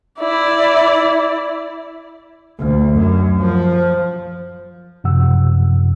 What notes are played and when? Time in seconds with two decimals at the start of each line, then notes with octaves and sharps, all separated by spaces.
0.19 E4 D5
2.59 D2
2.94 F#2
3.43 F3
5.04 F#2 C3 F3 F#5 E6